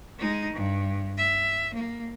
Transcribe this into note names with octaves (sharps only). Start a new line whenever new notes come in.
G#3 D#4
G2
E5
A#3